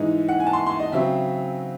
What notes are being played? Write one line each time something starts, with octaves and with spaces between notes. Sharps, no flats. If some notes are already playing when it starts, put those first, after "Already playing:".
Already playing: G#2 E3 G#3 D#4
F#5
G#5
A5
C6
C6
D#5
C#3 F#3 C4 E5